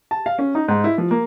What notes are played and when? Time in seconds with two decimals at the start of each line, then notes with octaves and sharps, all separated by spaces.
0.11 A5
0.26 F5
0.38 C#4
0.55 D#4
0.68 G#2
0.84 E4
0.98 F3
1.11 A#3